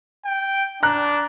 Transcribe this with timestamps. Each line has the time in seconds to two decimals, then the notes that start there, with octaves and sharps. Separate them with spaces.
0.25 G5
0.83 D4 A#5 F#6